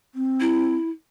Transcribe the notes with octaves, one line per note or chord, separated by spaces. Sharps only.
C4
E4